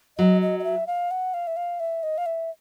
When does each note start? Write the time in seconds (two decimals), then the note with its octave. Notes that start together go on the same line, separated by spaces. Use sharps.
0.18 F#3 D#5
0.42 D#5
0.59 D#5
0.64 E5
0.87 F5
1.11 F#5
1.34 F5
1.47 E5
1.57 F5
1.80 E5
2.03 D#5
2.18 F5
2.26 E5